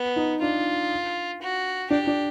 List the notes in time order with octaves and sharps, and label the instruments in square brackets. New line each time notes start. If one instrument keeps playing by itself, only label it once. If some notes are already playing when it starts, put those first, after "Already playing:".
Already playing: [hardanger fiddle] B3
[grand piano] D#4
[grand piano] D4 [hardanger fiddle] F4
[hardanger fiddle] F#4
[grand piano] D4 [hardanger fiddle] G4
[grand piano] D4